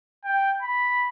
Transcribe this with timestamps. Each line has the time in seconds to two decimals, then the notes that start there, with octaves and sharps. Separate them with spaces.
0.25 G5
0.62 B5